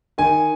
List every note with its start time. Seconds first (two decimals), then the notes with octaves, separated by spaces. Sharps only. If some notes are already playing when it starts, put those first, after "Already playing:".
0.18 D#3 G#5